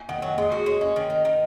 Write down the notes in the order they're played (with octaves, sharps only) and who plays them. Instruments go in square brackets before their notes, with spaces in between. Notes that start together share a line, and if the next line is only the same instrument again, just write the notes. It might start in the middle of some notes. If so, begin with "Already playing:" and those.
Already playing: [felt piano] G#5
[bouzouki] D#3 [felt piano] F#5
[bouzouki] F#3 [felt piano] D#5
[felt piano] F#5
[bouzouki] G#3 [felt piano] D#5
[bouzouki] F#4
[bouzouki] G#3 [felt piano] C#5
[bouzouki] C#4 [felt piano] D#5
[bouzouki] D#3
D#4
D#3